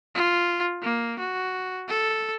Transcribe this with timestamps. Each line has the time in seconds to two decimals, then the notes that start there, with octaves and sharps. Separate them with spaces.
0.15 F4
0.82 A#3
1.19 F#4
1.88 A4